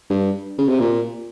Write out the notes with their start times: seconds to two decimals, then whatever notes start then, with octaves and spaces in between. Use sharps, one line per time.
0.10 G2
0.58 C#3
0.69 C3
0.80 A#2